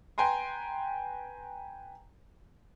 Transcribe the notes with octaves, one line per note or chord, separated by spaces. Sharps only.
B4 G5 G#5 A#5 C6